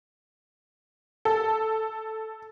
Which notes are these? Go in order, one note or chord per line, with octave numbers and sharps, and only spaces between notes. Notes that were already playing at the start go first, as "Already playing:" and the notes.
A4